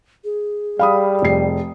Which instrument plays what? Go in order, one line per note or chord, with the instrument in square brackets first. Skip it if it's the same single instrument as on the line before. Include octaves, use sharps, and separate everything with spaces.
[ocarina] G#4
[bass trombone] G3 [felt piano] F5 B5 D#6
[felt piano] F1 C7